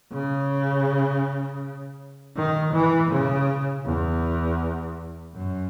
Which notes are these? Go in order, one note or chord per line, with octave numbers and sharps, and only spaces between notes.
C#3
D#3
E3
C#3
E2
F#2